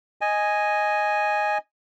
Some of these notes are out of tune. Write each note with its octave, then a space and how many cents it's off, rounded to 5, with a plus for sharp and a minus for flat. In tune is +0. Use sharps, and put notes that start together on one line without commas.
D#5 +0 G#5 +0